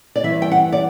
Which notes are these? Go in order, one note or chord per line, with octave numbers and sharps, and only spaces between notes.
D5
G2 E3 E5
G5
F#5
D5